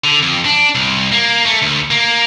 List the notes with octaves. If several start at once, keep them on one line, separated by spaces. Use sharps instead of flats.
D3
F2
D4
C2
A#3
A3
D2
A#3